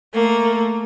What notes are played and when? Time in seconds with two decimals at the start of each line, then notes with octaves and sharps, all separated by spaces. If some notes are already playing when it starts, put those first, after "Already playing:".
0.13 A3 A#3